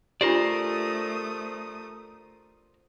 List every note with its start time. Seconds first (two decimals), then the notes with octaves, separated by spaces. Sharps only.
0.21 A3 D4 F4 G4 A#4 C5 D5 D#6